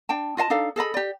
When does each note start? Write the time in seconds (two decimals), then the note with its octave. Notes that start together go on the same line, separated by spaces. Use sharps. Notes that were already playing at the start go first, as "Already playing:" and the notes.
0.09 D4 G5 A5
0.37 F4 D#5 F5 A5
0.50 D4 D#4 A4 F5
0.76 G#4 A4 D#5 B5
0.94 G4 D5